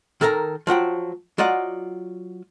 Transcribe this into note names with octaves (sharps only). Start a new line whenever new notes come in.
D#3 A4 A#4 E5 A#5
F3 F#3 F#5 G5
F#3 F4 D5 D#5 F#5